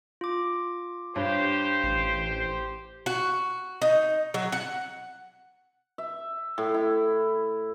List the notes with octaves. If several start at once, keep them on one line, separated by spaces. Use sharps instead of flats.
F4 D6
G2 G4 C5 C#5
A1 C7
F#4
D#4
F#3
F#5
E5
A2
E4